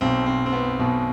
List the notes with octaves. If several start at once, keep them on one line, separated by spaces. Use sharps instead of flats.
B1 B2 C4
C4
C4
B3
B1 B2